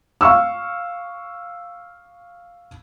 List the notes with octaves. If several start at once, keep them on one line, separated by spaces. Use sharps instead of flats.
F5 C#6 E6